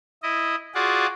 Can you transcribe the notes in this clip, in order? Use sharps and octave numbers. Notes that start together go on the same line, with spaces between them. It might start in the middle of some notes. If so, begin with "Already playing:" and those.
E4 D#5
F4 F#4 G#4 D5 F#5